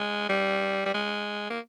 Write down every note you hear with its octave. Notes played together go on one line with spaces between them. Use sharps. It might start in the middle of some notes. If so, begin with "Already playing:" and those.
Already playing: G#3
G3
G3
G#3
A#3